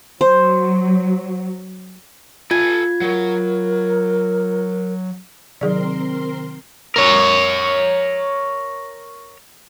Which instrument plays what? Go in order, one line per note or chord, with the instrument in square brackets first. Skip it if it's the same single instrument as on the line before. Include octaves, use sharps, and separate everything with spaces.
[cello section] F#3 [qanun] C5
[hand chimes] F4 G#6 [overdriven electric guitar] A4 G#5
[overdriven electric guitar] F#3 [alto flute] A#4
[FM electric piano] C3 D#3 [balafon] F#3 G#4 D5 [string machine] C4 A#4 C6
[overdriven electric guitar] A#4 C#5